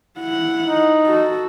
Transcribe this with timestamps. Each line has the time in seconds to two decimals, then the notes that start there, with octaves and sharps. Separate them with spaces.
0.20 E4 F#5
0.67 D#4
1.06 F#4 A4